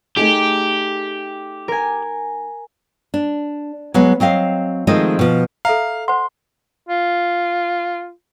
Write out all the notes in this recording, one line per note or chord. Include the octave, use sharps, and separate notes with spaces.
A3 D#4 G4 G#4 D7
A#4 G#5
D4
F#3 G#3 B3
F#3 C4 D#5 F5
D#3 F3 G#3 A3 C4 D#5
B2 F3
A4 E5 F5 A#5
C5 F#5 C6
F4